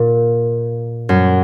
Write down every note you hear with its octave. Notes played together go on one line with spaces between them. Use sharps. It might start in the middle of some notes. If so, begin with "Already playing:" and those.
Already playing: A#2
F#2